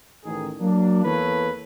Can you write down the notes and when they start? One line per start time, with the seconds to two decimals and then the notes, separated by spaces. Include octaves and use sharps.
0.24 A1 D#3 G#4
0.59 F#3 A#3 D4
1.04 E2 E3 A#3 A4 B4 C#5